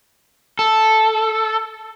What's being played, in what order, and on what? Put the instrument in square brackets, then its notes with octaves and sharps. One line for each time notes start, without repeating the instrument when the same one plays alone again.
[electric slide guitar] A4